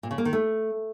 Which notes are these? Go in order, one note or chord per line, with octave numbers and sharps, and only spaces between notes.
A#2
C#3
A#3
D#3
A3